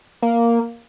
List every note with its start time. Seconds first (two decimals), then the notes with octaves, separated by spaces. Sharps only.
0.22 A#3